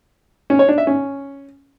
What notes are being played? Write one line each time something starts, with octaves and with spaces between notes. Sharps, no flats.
C#4
C#5
D4
E5
C#4